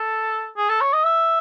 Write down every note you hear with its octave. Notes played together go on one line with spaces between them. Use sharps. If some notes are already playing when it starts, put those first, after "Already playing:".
Already playing: A4
G#4
A4
C#5
D#5
E5